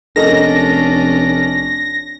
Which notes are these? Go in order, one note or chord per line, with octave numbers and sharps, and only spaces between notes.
F1 C#4 D4 A4 A#4 D#5 A#6